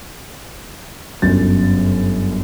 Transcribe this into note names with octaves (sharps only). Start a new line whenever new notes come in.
G1 F#2 A6